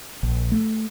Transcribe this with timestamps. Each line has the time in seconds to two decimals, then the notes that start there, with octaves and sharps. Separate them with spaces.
0.23 A#1
0.52 A3